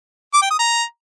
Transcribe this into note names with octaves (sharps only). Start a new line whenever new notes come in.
D6
G5
D#6
A#5